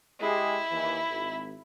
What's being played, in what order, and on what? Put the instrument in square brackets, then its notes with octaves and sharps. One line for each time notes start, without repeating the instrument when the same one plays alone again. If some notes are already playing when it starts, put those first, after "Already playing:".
[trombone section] G#3 G4 G#4 [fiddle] E4
[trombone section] D#2 E3
G#1